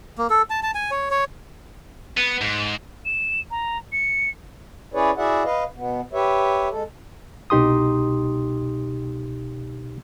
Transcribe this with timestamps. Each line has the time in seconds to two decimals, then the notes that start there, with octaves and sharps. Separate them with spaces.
0.18 A#3
0.30 A4
0.50 A5
0.63 A5
0.75 G#5
0.91 C#5
1.11 C#5
2.17 B3
2.41 G#2
3.05 E7
3.51 A#5
3.92 C#7
4.94 C#4 E4 G#4 B4 C#5 D5
5.17 E4 F#4 G#4 D5 E5 F#5
5.45 B4 D#5 F5
5.76 B2 B3
6.13 G4 B4 C#5 E5
6.71 G#3 A4
7.50 C2 B2 D#4 G4 C6 D#6